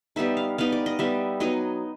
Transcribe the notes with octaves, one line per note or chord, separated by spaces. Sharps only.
G3 B3 D#4 E5
F5
G3 B3 D#4 F5
D5
D#5
G3 B3 D#4 E5
F#3 B3 D#4 D#5